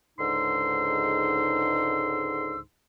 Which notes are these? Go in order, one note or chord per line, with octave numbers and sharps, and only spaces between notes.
C#2 G#2 D3 D#4 C6 E6